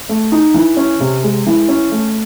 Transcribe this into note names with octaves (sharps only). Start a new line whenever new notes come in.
A3
D#4
E3
C#4
C3
G#3
E3
C#4
A3